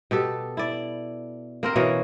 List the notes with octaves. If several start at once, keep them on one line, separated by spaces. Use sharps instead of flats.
B2 G4 A4
E4 D5
A#3 C4 A#4
B2 E3 A#3 C#4